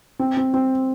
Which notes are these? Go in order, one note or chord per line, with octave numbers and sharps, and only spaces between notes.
C4
C4
C4